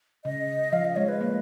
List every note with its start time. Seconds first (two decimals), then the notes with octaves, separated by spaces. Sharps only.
0.25 C#3 D#5
0.72 F3 F5
0.85 D#5
0.96 G#3 C#5
1.09 B4
1.21 A#3